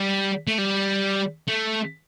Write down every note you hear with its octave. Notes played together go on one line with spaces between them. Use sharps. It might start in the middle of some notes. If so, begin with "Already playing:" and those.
Already playing: G3
A3
G3
A3